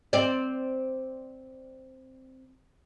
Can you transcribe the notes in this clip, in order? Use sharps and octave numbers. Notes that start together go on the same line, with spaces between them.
C4 D5